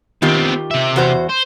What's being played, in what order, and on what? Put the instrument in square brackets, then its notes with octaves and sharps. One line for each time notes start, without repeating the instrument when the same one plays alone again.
[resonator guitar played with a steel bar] D#3 F4 G4 [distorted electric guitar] B3 C4
[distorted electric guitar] C3 E5
[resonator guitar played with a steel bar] E2 F#4 C5
[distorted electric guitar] C5